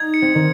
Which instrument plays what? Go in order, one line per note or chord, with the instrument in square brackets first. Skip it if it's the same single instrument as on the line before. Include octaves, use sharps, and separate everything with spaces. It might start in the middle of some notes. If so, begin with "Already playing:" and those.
Already playing: [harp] D#4 [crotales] G#6
[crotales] C#7
[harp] C4
D#3